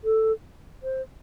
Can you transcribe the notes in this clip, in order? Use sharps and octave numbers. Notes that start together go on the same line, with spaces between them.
A4
C5